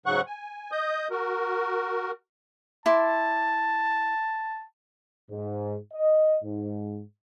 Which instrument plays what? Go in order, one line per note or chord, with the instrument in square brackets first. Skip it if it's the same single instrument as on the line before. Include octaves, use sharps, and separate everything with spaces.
[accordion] G#2 C#3 F#3 F#5 C#6 F#6
G#5
D#5 D#6 G6
F#4 A#4
[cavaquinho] E4 C6 D6 [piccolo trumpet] A5
[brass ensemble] G#2
D#5
G#2